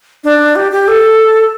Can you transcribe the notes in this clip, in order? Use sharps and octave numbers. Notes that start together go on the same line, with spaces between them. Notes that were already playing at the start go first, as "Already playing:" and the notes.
D4
G4
G4
A4